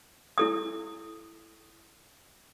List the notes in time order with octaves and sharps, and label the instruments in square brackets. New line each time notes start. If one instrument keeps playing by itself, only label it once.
[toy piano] E4 A4 D#6